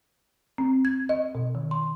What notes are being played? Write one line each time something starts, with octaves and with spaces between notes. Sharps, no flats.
C4
G#6
D#5
B2
D#3
C6